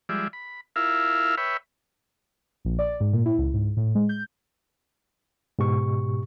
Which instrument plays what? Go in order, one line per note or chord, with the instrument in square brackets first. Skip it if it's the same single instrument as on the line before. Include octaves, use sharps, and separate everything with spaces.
[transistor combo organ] F3 G3 G#3 D5 E5
B5
E4 F4 A#4 E5 F5
B4 C#5 E5 G5 B5
[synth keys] A#1
D5
G#2
A#2
E4
C#2
G#2
A2
G#3
G6
[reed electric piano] G#2 B2 G4 C#6